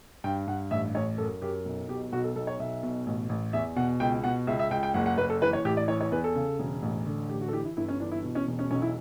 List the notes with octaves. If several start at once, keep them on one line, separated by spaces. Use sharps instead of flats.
G2 G5
G2 F#5
A1 E5
A1 C#5
F#2 A4
F#2 G4
B1
B2 G4
B1 F#4
A4
B1 A4
C#5
B1 E5
B2
A1
A1
E2 E5
B2 F#5
C#2 G5
B2 F#5
C#2 E5
E5
C#2 G5
G5
F#1 F#5
F#5
F#1 B4
A4
E3 B4
C#5
A1 G4
D5
E3 C#5
C#5
E2 B4
A4
C#3
E1
A1
D3
A1 G4
F#4
A4
E3 G4
E4
G1 E4
C#4
E3 D4
E4
B2
C#4
E1
C#4
B1 C#4
E4